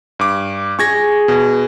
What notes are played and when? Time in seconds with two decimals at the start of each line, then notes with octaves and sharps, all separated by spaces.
0.19 G2 D6
0.79 G#4 C#6 G#6 A#6
1.28 B2